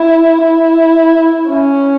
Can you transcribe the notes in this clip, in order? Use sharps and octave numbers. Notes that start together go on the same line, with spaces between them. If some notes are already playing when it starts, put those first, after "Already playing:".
Already playing: E4
E4
C#4